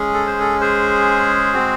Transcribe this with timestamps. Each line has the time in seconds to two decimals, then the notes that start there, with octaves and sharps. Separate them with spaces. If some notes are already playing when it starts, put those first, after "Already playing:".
Already playing: G#3 C#4 G#4
0.14 A4
0.27 C5
0.40 A4
0.61 G#4 C5
1.54 G#3 C4 F#4